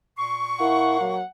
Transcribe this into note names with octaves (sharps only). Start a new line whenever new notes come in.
A#2 C6 C#6
A#3 E4 F#5
F#3